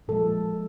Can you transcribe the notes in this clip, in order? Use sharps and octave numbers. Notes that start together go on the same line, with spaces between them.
A#2 F3 G#3 A4